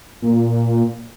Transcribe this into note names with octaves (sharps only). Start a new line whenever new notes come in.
A#2